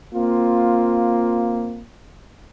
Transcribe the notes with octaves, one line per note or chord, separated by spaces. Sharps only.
A#3 C4 F4